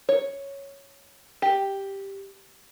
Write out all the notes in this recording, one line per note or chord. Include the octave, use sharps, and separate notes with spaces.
C#5
G4